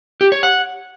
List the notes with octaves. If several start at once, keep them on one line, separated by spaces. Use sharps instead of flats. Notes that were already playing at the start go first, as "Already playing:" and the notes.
G4
C#5
F#5